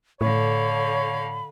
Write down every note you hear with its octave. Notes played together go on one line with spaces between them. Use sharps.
A2 D3 A4 C#5 F5 B5